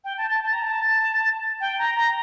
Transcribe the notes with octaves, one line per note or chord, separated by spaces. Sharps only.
G5
A5
A5
A5
A#5
A5
G5
A#5
A#5